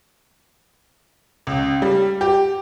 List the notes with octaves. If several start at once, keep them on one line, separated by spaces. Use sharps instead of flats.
C#2
G3
G4